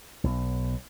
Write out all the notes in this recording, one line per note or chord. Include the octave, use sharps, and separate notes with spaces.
B1